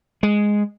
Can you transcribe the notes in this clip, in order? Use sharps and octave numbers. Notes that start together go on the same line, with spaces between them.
G#3